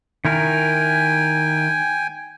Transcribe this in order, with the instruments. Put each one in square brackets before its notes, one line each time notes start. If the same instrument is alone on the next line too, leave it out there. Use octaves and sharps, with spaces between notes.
[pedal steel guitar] D#3 E4 A#4 [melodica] G5 G#5